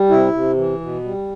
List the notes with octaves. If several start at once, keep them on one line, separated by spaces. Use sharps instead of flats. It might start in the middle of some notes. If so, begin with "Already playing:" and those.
Already playing: G3
C3 E4
C3
E3
B2
G3